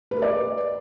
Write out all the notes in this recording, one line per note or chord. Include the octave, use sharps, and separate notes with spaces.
B4
A#4
D5